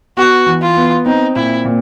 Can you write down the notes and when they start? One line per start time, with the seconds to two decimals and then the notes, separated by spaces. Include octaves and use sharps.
0.17 B3 F#4
0.47 E3
0.61 F4
0.77 B3
1.06 C4 D#4
1.36 A#2 E4
1.65 A#2